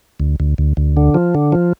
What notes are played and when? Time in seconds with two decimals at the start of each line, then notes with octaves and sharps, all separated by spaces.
0.20 D2
0.40 D2
0.58 D2
0.77 D2
0.97 D3
1.14 F3
1.35 D3
1.52 F3